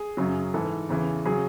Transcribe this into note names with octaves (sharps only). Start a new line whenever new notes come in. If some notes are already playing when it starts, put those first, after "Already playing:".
Already playing: G#4
F#2 C#3 F#3
G#2 E3 A4
E2 C#3 E3
C#3 F#3 G#4